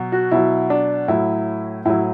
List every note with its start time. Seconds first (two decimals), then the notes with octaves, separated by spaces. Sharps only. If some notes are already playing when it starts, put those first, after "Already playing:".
Already playing: B2 F#3
0.12 F#4
0.31 B2 F#3 E4
0.70 D4
1.08 A2 F#3 E4
1.85 A2 F#3 E4